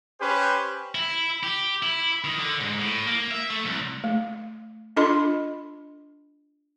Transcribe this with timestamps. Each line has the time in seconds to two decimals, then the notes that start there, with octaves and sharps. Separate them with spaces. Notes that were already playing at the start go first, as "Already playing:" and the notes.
0.20 C#4 G4 B4 C5
0.95 E4
1.43 G4
1.83 E4
2.24 D#3
2.39 D3
2.60 G#2
2.79 A2
3.06 A#3
3.31 E5
3.50 A3
3.66 C2
4.04 A3
4.96 D4 F4 A4 D#5 B5 C6